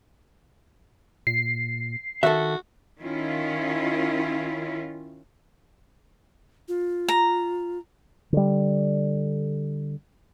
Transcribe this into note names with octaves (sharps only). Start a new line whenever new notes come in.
A#2 C7
D#3 F#4 A4 E5
D#3 C#4 E4 F4
F4
A#5
D3 G3